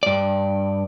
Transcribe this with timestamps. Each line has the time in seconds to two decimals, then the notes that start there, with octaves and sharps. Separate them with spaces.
0.03 G2 D5